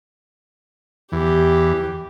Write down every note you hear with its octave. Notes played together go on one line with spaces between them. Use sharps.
E2 G4